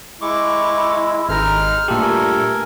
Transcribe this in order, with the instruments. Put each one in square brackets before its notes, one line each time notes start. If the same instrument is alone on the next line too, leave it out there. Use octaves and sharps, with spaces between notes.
[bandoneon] G#3 [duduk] E4 [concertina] C#6 D6
[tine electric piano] G#1 A#5 [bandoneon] G#3 D#4 [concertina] F6
[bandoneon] G2 A4 [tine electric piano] A#2 G4 [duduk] A3
[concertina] A#4 G#5